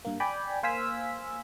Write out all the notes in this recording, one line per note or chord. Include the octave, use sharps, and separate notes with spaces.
G2 A#3
D5 G5 G#5 B5
A#3 C5 F5 G#5 E6 B6